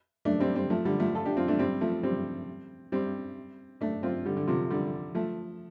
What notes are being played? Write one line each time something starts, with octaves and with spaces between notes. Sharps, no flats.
A3 D4
G3 C4
G3 C4
F3 A3
D3 G3
F3 A3
F4 A4
D4 G4
C4 F4
A3 D4
G3 C4
F3 A3
G3 C4
G3 C4
A3 D4
C4 F4
D3 G3
D3
C3 F3
D3 G3
F3 A3